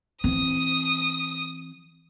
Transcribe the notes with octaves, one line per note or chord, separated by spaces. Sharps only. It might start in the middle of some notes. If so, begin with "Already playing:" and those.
E3 C4 D#6